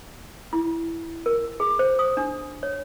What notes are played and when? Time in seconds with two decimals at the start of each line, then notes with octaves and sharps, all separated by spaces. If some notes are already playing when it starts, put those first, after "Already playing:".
0.53 E4
1.26 A#4
1.60 G#4
1.79 C5
1.99 D#6
2.17 D4
2.63 C#5